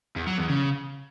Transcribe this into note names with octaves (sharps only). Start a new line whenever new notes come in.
E2
F#3
E2
C#3